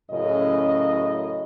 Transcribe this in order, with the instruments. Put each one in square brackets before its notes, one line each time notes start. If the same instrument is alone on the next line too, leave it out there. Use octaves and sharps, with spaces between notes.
[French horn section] F#2 A2 C#3 D#5